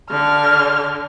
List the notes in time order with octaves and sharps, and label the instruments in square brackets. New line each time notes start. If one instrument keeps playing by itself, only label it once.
[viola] D3 [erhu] F6